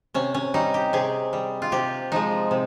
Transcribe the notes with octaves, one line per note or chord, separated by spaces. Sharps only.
C3 C#4
C#4
G3 D#4
G4
C3 G#4
G3
F4
C3 G4
F3 G#3 D#4
C3